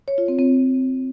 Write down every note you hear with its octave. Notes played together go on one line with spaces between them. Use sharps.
C#5
F4
C4
C4